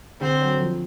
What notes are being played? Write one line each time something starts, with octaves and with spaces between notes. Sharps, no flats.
D3 C4
F#3
F3